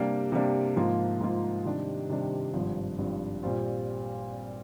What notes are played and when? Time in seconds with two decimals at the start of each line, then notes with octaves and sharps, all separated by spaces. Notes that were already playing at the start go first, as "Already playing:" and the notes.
Already playing: C3 G3 A#3 D4
0.32 C3 G3 A#3 D4
0.76 G#2 F3 A#3 F4
1.20 G#2 F3 A#3 F4
1.65 C3 D#3 G3 D4
2.09 C3 D#3 G3 D4
2.53 G#1 G2 F3
2.98 G#1 G2 F3
3.43 A#2 G3 C4 F4